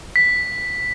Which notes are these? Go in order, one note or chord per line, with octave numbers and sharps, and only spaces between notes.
B6